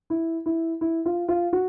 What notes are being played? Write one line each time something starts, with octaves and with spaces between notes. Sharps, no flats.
E4
E4
E4
F4
F4
F#4